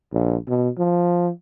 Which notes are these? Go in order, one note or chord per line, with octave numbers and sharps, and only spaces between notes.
A#1
B2
F3